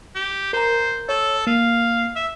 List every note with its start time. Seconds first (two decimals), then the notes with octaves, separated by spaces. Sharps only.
0.15 G4
0.53 A#4 C5 A#5
1.09 A4 C#5
1.47 A#3 F5
2.15 E5